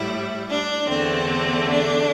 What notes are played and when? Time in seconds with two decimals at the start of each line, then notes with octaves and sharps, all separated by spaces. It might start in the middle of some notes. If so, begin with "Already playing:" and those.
Already playing: A2 G3 E4
0.48 D4
0.87 E2 D3 A3 C4
1.68 D4